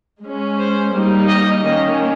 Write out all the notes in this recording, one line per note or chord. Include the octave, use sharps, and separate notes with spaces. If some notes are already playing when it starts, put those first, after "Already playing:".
G#3 C#4
C5
G3 A#3 D#4
D#5
D#3 A#3 C#4 D#5